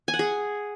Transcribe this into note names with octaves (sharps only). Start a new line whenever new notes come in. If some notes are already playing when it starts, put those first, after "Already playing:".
G#5
F#5
G#4